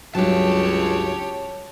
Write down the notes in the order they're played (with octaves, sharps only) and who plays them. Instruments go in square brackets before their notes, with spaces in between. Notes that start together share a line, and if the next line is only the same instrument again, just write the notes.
[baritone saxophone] C#2 [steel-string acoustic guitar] G2 F#3 [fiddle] G4 C#5 [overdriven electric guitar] A5